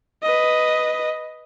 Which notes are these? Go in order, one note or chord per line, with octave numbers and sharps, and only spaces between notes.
B4 D#5